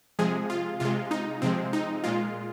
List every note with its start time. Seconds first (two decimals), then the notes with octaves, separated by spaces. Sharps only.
0.19 C3 F3 G#3 G#4
0.50 F4
0.80 C3 G#3 F4
1.11 D#4
1.42 C3 F3 G#3 C4
1.73 D#4
2.04 A#2 G#3 F4